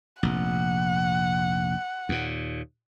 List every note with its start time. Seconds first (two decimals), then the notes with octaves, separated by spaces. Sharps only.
0.23 F1 A#1 F#5
2.09 D#2 A#2